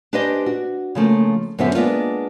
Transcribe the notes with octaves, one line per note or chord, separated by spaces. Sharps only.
D4 G4 B4 C5 D#5 G#5
F#4
C#3 F3 A3 A#3
F#2 D3 B3 C5 E5
G#3 A#3 B3 D4 F4